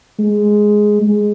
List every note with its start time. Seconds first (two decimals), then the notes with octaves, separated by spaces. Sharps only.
0.19 G#3
1.01 G#3